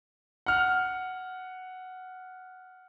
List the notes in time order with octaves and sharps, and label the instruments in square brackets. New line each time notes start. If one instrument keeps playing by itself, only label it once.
[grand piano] F#5 F6